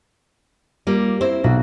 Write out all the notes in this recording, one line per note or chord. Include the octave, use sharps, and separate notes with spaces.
G3 A#3 F4
C4 E4 C5
B1 F#4